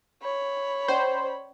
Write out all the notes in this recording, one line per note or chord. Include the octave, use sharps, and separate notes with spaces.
C#5 B5
C#4 C5 D5